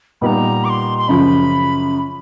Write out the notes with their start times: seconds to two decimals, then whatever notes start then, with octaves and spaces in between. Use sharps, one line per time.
0.21 A#2 G3 B3 D#4 A#5 B5
0.65 D6
0.69 C6
0.98 C6
1.08 F#2 C#3 F3 B5